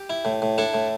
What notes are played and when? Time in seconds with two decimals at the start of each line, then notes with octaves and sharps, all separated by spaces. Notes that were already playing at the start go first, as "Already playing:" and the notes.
Already playing: G4
0.10 E4
0.25 A2
0.42 A2
0.58 D4 E4 A4
0.74 A2